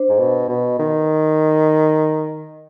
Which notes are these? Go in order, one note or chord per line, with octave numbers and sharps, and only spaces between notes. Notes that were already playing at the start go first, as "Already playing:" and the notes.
Already playing: D4 C5
G#2
B2
B2
D#3